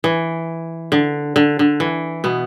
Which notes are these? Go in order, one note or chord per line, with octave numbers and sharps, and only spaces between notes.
E3
D3
D3
D3
E3
B2 B3